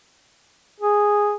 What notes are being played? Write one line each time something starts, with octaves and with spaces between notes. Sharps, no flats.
G#4